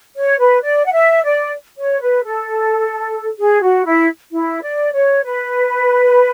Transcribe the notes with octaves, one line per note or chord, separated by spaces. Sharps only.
C#5
B4
D5
F#5
E5
D5
C#5
B4
A4
G#4
F#4
E4
E4
D5
C#5
B4